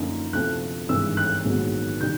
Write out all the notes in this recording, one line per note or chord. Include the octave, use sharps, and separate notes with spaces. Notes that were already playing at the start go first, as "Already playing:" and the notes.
Already playing: F#2 D3 F3 A#3 D#4
D2 C3 F3 A3 C4 F#6
G#1 G2 E3 G#3 C4 E6
F#6
A#1 G#2 D#3 F#3 B3
D#3 G3 G6